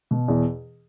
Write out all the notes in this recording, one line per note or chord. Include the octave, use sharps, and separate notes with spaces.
B2
E2